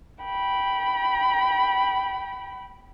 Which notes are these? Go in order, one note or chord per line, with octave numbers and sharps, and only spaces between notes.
G5 B5